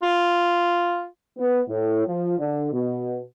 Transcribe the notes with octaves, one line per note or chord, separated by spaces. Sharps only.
F4
B3
A2
F3
D3
B2